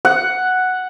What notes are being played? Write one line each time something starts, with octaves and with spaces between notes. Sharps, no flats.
F#5